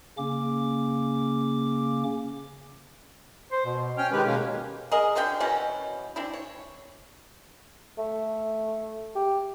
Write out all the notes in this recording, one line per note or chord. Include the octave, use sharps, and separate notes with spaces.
C#3 A#3 C#4 D6
C5
B2
C#4 G5 F6
D#3 G#3 G4 B4
B2 G#3 A#3 C#4
G#4 A#4 D#5
B2 D3 C#4 G5
B2 E3 F#3 C#4
C4 D4 E4
C#5
A3
G4